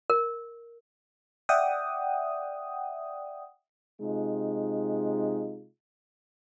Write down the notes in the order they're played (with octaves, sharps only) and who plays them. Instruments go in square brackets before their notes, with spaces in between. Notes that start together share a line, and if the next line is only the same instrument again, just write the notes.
[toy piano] A#4
[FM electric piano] D5 E5 F#5 G5 D#6
[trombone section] C3 G#3 D#4 F4